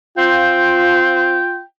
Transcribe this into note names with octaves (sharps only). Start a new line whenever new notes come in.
C4 F4 G5